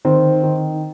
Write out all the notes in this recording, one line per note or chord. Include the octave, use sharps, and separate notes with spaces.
D#3 C4
D#3